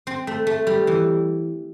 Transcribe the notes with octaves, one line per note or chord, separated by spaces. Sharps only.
C4
A3
A3
G3
E3